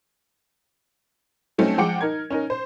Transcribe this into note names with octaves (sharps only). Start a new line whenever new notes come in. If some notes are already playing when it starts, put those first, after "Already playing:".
F#3 A3 C4 C#4 D#4
F3 G#3 F#5 G5 D6 C#7
D#4 A#4 G#6
C#4 D#4 A#4
C5